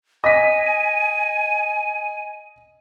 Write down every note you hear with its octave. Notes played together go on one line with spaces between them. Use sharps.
D#5 G#5 B6